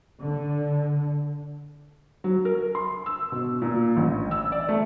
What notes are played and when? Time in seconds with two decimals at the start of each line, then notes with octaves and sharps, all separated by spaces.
0.23 D3
2.24 F#3
2.45 A#4
2.75 C6
3.06 E6
3.32 B2
3.62 A#2
3.97 A1
4.31 E6
4.52 D5
4.68 A3